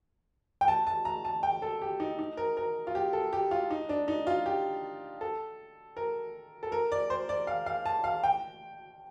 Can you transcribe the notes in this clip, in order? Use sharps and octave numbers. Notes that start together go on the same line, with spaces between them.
G5
A5
A5
A#5
A5
G5
A4
G4
D#4
D#4
A#4
A#4
F4
G4
A4
G4
F4
D#4
D4
D#4
F4
G4
A4
A#4
A4
A#4
D5
C5
D5
F5
F5
A5
F5
G5